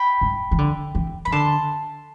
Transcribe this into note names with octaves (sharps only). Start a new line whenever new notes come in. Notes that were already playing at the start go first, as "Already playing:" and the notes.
Already playing: G5 B5
G2
E3
D3
E3
E3 B5
D3 A5 C6